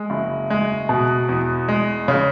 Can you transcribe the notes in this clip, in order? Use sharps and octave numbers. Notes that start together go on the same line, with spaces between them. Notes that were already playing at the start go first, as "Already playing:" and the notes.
Already playing: G#3
F#1
G#3
B2
E2
G#3
C#3